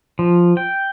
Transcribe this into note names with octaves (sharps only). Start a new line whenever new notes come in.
F3
G5